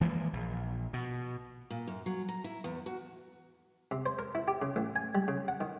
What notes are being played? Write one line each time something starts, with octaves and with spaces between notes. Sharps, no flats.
E3 F3 G#3 A#3
A#1
B2
A#2
F#2
F#3
A#5
E4
E2
F#4
C3
C5
A#4
E4
G4
C#3
A1
G#5
G3
C#3
F#5
D#3